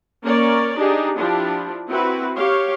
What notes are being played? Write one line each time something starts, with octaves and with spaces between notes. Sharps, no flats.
A#3 C#4 A#4 C#5 D5
D4 D#4 G4 G#4
F3 D4 E4 F4 G4
C4 E4 F#4 B4
G4 C#5 F5